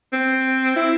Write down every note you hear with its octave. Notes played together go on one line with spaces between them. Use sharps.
C4
E4